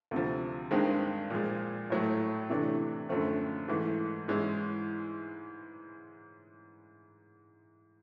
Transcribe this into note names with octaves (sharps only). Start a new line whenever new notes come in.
D2 C3 F3
G2 D#3 G#3 C4 D#4
A#2 F3 G#3
A2 F#3 A3
C3 E3 A3 D4
F#2 D3 F3 A3 C4
G#2 E3 A3
G#2 E3 G#3 C#4 E4